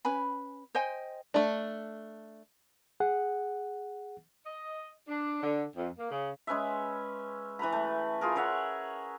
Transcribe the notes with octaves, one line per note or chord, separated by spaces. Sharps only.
C#4 B4 G#5 B5
C5 D#5 G5 G#5
A3 D4
G#4 F#5
D#5
D4
D3
F2
A#3
C#3
G#3 C#4 B4 E5
E3 B4 A#5 B5
A3
F4 G#4 A#4
A#4 C#5 E5 F#5